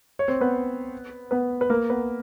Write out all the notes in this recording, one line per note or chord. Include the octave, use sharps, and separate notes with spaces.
C#5
C4 C5
B3 B4
B3 B4
B4
A#3 A#4
B3 B4